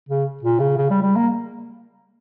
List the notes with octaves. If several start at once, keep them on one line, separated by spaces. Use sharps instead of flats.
C#3
A#2
C#3
C#3
G3
G3
A#3